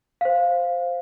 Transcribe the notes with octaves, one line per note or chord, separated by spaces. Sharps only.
C5 F5